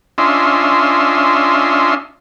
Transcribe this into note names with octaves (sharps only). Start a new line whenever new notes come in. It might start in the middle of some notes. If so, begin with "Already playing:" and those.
C#4 D4 F4 D#5 E5 C6